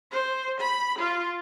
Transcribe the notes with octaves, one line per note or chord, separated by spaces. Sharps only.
C5
B5
F4